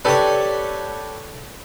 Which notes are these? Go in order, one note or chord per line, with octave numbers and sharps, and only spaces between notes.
D4 G4 A4 B4 C#5